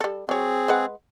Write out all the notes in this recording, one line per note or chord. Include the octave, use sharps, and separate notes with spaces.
G3 A4
F#3 C4 G#4 C#5
G#3 B4 F#5